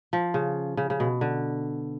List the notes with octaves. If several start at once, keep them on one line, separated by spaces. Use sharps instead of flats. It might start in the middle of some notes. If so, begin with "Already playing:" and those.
F3
C#3
C#3
C#3
B2
D3